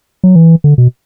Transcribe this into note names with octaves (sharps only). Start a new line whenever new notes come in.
F#3
E3
D3
B2